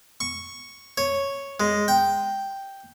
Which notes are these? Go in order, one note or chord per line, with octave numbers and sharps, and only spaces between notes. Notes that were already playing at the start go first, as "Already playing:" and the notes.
C#6
C#5
G#3
G5